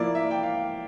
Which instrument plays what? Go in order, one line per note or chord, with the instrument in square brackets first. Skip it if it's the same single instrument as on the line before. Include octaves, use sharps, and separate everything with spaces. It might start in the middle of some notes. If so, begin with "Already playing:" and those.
Already playing: [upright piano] F3 A#3 E4 D5
E5
G5
F5